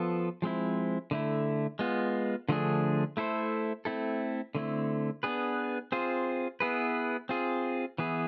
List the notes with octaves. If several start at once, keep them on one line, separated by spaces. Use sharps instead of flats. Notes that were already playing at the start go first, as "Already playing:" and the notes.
Already playing: F3 B3 F4 A4
F3 G#3 C4 E4
D3 A3 E4
G#3 B3 F4
D3 F3 A3 D4 G#4
A3 E4 A4 C5
A3 C4 E4 A4
D3 A3 C4 E4
B3 D4 G#4 B4
C4 F4 G#4 C5
B3 E4 G#4 B4
C4 F4 G#4
E3 B3 E4 G#4